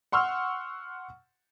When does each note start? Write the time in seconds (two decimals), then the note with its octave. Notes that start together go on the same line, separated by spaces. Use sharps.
0.12 F#5 C6 C#6 E6 F6